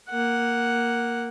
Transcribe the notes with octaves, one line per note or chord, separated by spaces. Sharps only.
A#3 F#5